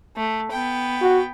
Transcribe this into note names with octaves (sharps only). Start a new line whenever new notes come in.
A3
B3 G5
F#4